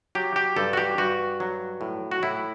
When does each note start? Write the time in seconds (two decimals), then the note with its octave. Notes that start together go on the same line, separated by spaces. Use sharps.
0.15 F#3 G4
0.36 G4
0.56 G2 A4
0.73 F#4
0.77 G4
0.98 G2 F#4
1.40 F#3
1.81 A2
2.11 F#4
2.23 A2 E4